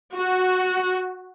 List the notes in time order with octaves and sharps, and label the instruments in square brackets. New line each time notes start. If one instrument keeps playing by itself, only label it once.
[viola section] F#4